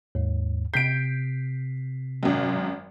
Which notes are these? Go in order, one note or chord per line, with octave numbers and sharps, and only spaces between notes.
D#2 G#2
C3 G6 B6 C7 D7
G#1 F#2